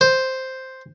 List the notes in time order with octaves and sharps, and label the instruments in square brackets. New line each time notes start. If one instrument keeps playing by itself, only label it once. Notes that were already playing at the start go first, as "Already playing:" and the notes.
[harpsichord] C5